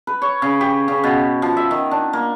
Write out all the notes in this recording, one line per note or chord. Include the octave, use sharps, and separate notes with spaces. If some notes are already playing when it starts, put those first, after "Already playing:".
B4
C#5
C#3
G4
C#3
B2
F3
E5
D#3
D4
A#3